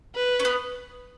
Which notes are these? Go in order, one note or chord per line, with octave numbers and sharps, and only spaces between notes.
B4
C#4
B3